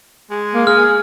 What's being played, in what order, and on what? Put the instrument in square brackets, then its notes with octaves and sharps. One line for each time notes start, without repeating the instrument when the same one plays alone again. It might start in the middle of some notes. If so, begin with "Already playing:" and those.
[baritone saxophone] G#3
[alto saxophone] A#3
[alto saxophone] G#4 [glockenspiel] F6